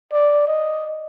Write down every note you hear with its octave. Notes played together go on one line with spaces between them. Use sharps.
D5
D#5